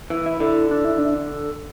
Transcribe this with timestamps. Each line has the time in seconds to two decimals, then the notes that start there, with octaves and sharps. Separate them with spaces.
0.10 E3
0.26 E4
0.40 D3
0.71 D4
0.85 E4
0.98 D4